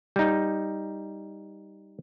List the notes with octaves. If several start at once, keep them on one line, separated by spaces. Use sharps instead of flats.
G3 D#4